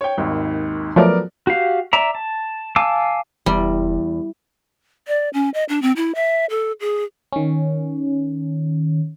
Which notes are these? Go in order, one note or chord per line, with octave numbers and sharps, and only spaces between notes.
C#5 G5
G#1 D#2
F3 F#3 A3 B3 A#4 D5
F#4 G4 F5
D5 E5 A#5
A5
F5 G#5 A5 D6 E6
F1 E2 G3
D5
C#4
D#5
D4
C4
E4
E5
A4
G#4
D#3 C#4